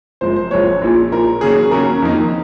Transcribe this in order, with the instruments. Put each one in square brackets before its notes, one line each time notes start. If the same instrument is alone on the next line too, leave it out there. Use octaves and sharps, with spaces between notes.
[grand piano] F#1 F#2 F3 G#3 C5
C5
F#1 F#2 F3 G#3 C#5
A#1 A#2 F3
A#1 A#2 F3 A#4
D#2 C#3 F#3 C#4 G#4
D#2 C#3 F#3 C#4 A#4
F2 D#3 A#3 D#4